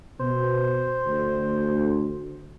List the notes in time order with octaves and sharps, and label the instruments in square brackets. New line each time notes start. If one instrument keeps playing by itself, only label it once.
[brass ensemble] B2 [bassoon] C5
[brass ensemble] D2